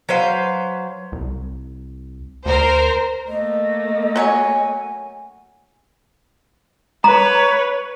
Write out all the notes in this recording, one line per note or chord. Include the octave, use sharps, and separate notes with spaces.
F#3 B4 C5 F5
C2
D2 A#4 C5
A3 A#3 D#5
F#3 C#4 C#5 G#5
B4 C#5 A#5